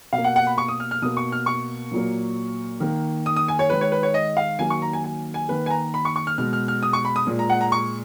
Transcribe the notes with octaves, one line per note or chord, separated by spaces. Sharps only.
B2 F5
A#3
F#5
F#5
B5
C#6
D#6
F6
F6
B2 A#3 D#6
C#6
F6
C#6
A#2 F#3 A#3
D#3 A#3
D#6
D#6
G#5
C#5
D#3 G#3 B4
C#5
B4
C#5
D#5
F5
D#3 F#3 A#3 G#5
C#6
A#5
G#5
G#5
G#5
D#3 A#3 B4
G#5
A#5
B5
C#6
C#6
F6
B2 G#3 F6
F6
F6
D#6
C#6
B5
D#6
A#2 G#3
A#5
F#5
A#5
C#6